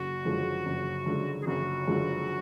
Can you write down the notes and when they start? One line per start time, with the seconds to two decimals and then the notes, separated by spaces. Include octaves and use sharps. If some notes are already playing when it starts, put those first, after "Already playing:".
Already playing: F#1 F#4
0.25 F#2 D3 F3 G#3
0.66 F#1
1.06 F#2 D3 F3 G#3
1.41 G#4
1.47 F#1 F#4
1.88 F#2 D3 F3 G#3